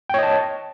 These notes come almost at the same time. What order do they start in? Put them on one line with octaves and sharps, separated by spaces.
G5 C#5 D#5 A5